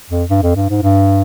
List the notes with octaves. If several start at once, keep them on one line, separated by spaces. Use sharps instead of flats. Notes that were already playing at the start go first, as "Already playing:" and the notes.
F2
G2
F2
G2
G#2
G2